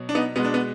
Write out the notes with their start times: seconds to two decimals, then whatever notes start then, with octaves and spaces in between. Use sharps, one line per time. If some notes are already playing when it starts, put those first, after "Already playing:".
Already playing: B2 F#3
0.09 D4
0.15 B3 D#4
0.36 B2 G#3 B3
0.45 D4
0.54 B3